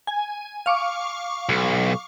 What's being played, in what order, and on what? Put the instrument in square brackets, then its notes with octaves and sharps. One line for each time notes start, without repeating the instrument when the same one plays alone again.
[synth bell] G#5
F5 C#6 D6
[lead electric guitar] B1